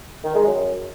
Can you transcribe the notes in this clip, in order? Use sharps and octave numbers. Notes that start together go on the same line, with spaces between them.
D#3
G#3
F#2